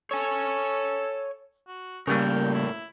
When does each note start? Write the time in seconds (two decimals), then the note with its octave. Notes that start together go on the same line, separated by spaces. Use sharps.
0.11 A4 C#5 G#5
1.67 F#4
2.07 A2 C#3 G3 A#3 A#4 G5
2.54 E4